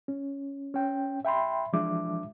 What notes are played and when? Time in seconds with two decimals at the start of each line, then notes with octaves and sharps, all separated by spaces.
0.08 C#4
0.74 C#4 G5
1.25 E5 G5 B5 C6
1.73 E3 F3 G#3 D4 E5 D6